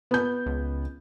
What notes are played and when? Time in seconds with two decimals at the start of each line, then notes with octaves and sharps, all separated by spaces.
0.11 B3 G6
0.46 C#2